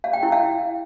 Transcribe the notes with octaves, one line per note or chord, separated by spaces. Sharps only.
F5
G5
E4
F5